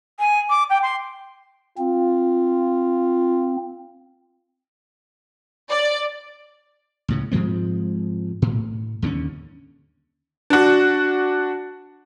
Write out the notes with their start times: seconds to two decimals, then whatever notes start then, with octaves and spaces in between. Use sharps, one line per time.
0.19 G#5
0.49 D6
0.69 G5
0.82 C6
1.78 C4 F4
5.71 D5
7.08 C#2 A2 C#3
7.31 G#2 F3 G#3 C4
8.42 A2
9.02 D#2 D3 C4 C#4
10.50 D4 F#4